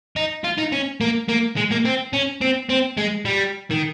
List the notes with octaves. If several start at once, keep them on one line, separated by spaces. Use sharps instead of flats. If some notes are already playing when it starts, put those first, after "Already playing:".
D#4
F4
D#4
C#4
A#3
A#3
G#3
A#3
C4
C#4
C4
C4
G#3
G3
D#3